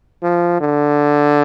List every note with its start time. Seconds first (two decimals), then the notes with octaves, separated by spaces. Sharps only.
0.23 F3
0.61 D3